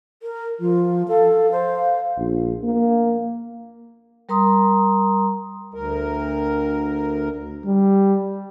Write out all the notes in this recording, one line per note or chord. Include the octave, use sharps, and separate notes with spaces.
A#4
F3 F4
A4 F5
C5
A#1
A#3
G3 A#4 A#5 C6 D#6
D2 A#4
G3